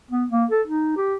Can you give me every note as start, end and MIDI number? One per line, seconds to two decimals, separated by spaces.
0.11 0.26 59
0.30 0.45 58
0.51 0.62 69
0.67 0.93 63
0.97 1.16 67